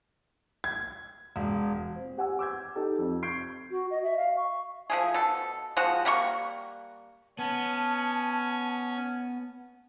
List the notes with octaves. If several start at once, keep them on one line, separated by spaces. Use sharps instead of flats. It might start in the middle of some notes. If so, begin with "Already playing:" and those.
G#6
E1
C4
G4 F#5 G#5 E6
D6 E6 G6 G#6
D#4 G4 A4 A5
F2
C#6 G6 G#6 C7 D7
F#4
D#5
E5
F5
C#6
F3 A3 G#4
B2 A4
F3 G#3 C4 F#4
G3 A#3 G#4 C#6
B3 C#4 G#5 A5